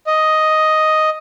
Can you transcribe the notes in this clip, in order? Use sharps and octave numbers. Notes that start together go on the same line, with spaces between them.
D#5